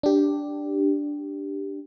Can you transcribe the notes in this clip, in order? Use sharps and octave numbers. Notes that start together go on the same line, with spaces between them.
D4 G4